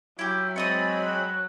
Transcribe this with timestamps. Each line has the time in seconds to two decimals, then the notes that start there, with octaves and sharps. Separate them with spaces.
0.19 F#3 E4 G4
0.56 G#3 C4 C#5 D#5 B5 D#6 A6
1.04 F#6